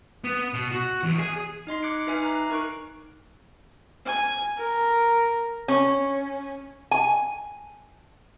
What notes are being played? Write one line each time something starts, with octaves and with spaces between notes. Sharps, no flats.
B3
B2
F#4
E2
G#4
D#4 D#5 C6 C7
D6 F#6 G#6 C#7 D7
D#4 B4 E5 G#5 F6 C7
A#5 D6 F#6 C7
D#4 A#4 C#6 F#6 D7
G#5
A#4
C#4
G#5